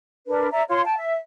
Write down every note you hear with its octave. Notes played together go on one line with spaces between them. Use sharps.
D4 A#4 B4
D5 E5 A#5
F4 C#5 C6
G5 A5
E5